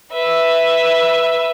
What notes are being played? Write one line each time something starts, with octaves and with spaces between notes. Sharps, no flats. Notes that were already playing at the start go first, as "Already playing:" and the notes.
B4 E5